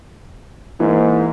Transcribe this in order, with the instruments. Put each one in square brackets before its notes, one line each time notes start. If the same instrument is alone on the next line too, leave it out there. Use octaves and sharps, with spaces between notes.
[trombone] G#2 [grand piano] E3 [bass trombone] A#3